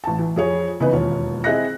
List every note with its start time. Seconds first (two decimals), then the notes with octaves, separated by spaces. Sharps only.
0.04 A1 A5
0.19 E3
0.36 F2 G#4 C#5
0.80 C#3 E3 B3 C#4 D#4 B4
0.93 E1 D#2 F4 C#5
1.44 C4 E4 G#4 D#5 F#6 A#6